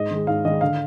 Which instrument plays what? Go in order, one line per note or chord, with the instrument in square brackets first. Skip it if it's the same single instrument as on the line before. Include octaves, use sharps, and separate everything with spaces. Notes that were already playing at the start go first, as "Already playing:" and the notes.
Already playing: [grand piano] G#2 D#5
D#3 G#3
G#2 F5
D#3 G#3 D#5
D3 F5